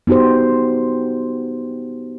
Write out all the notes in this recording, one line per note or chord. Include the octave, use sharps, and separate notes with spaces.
B3 D#4 F#4 G4 C5